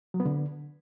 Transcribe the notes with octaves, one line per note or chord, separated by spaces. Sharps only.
F#3
B3
D3